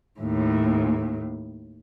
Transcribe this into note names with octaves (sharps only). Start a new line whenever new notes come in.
D#2 A2